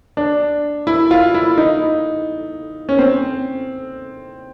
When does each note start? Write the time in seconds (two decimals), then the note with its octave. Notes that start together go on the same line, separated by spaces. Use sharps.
0.17 D4
0.87 E4
1.11 F4
1.34 E4
1.58 D#4
2.89 C#4
2.99 C4